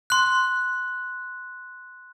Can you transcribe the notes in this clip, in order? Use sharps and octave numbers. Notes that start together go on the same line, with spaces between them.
C6 F#6